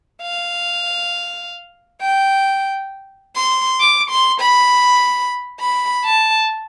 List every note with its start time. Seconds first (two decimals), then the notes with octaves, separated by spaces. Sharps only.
0.22 F5
2.01 G5
3.36 C6
3.81 D6
4.10 C6
4.40 B5
5.60 B5
6.05 A5